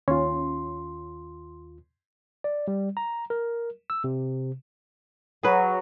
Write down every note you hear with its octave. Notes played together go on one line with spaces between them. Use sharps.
D#2 C#4 F4 C6
D5
G3
A#5
A#4
E6
C3
F#3 G#4 B4